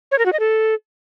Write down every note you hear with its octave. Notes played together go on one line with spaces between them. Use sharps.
C#5
A#4
F#4
D#5
A4